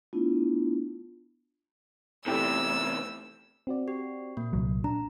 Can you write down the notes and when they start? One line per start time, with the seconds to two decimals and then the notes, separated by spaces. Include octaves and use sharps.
0.13 A3 B3 D4 E4 F4
2.26 E2 C3 A3 E4 G4 E6
3.67 C4 F#4 D5
3.88 G4
4.37 A#2 A#3
4.53 C2 F#3
4.84 D4 A#5